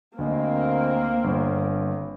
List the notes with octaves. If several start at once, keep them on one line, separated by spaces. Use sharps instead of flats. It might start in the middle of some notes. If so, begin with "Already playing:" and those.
D2 A#3 C4 D#5
G1